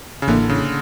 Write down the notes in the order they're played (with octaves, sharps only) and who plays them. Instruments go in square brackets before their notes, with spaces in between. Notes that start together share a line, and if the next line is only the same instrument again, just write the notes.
[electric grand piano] C#3
[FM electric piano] A1 A2 E3 A#3 E4 [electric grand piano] D3
[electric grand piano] C#3